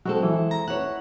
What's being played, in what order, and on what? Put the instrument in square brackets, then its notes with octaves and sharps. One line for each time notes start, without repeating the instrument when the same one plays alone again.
[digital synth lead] F#3 [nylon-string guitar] G#3 C4 A4
[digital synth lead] E3
A#5
[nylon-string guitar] E4 B4 C#5 [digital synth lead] F#5